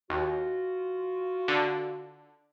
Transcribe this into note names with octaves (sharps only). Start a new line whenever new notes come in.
D#2 F4 F#4
D3